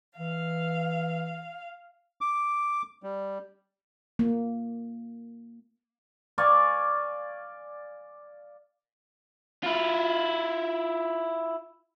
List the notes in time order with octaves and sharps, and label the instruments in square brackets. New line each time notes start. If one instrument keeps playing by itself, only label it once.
[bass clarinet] E3 [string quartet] F5
[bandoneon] D6
G3
[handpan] A#3
[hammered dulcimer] D5 F5 G#5 C#6
[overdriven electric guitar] E4 F4